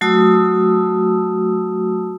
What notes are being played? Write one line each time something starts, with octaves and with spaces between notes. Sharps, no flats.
F#3 A3 F#4 A5 D#6 E6